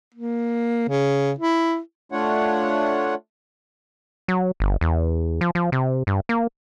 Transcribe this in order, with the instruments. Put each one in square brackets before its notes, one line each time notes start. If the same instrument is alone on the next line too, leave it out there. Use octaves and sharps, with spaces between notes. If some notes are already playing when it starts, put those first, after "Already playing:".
[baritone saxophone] A#3
C#3
E4
[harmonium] A3 D4 F4 C#5 F#5
[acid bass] F#3
G1
E2
F3
F3
C3
G2
A#3